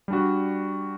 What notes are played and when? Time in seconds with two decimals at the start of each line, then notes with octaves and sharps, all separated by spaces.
0.08 G3 D4 F#4